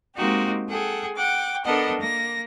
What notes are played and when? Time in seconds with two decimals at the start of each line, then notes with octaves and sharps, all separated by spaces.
0.15 G#3 A#3 C4 D#4 F#4 G4
0.68 G#4 A4 F#5 G5
1.16 F#5 G5 D6
1.64 B3 D4 A4 A#4 D#5 F#5
1.99 A#3 A#6